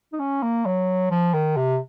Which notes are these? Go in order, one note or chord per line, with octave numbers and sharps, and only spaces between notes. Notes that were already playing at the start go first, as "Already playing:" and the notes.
D#4
C#4
A#3
F#3
F3
D#3
C3